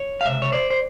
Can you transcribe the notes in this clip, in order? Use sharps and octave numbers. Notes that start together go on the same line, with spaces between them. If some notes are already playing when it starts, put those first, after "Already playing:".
Already playing: C#5
F5
C#2 C3 E5
C#5
C5 D5
C5